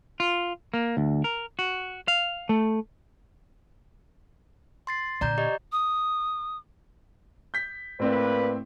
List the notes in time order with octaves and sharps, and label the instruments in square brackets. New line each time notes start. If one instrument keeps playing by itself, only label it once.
[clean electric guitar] F4
A#3
D2
A#4
F#4
F5
A3
[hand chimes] C6 A6 C7
[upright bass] A#2 D3 [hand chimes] D5 A#5 G6
[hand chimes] G4 D5 D#5
[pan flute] D#6
[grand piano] G6 B6
[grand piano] A2 C4 [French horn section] A#3 B4 D5